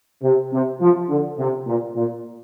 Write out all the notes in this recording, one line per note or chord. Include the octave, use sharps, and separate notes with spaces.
C3
C3
F3
D3
C3
A#2
A#2